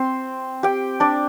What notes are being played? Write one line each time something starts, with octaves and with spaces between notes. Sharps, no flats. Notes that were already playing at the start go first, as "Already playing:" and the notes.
Already playing: C4 C5
G4 G5
D4 D5